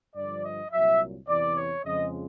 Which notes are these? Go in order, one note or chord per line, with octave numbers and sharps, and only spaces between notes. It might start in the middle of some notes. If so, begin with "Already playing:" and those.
G2 D3 F3 D5
D#5
C2 A#2 F#3 E5
E2 C3 E3 D5
C#5
F2 C#3 F3 G#3 D#5